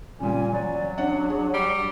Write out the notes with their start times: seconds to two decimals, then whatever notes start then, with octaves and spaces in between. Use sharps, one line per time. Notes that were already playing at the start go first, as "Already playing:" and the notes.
0.20 A#2 C#3 G3 G#5
0.52 F#2 F#3 D5
0.98 C#4 D4 F#5
1.30 G#4
1.54 G3